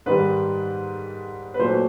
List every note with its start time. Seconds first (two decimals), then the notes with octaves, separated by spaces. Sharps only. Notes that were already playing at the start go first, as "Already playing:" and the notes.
0.06 G#2 D#3 G3 B4
1.54 B4
1.59 A#2 F#3 A3 C5